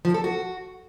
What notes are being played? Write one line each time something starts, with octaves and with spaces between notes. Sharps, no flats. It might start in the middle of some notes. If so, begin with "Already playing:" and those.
F3
A4
F#4